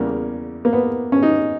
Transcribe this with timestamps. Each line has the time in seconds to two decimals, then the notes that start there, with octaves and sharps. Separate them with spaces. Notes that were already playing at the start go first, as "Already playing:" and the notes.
Already playing: E2 C#3 G3 A#3
0.65 A#3
0.73 B3
1.12 C#4
1.23 D#4